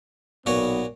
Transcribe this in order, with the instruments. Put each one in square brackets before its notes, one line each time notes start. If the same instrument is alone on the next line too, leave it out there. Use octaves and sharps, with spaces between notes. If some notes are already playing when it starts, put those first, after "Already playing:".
[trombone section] B1 B3 [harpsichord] A#2 F#4 C#5